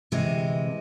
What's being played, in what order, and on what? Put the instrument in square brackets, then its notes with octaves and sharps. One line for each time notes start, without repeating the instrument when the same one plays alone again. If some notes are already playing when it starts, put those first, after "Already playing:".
[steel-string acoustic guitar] D2 C3 E3 G#3